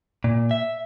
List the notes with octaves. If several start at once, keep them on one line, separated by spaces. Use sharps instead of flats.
A#2
E5